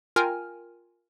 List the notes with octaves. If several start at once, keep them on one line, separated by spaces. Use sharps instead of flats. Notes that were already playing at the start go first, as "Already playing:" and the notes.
F4 A#4 G5 G#5 F6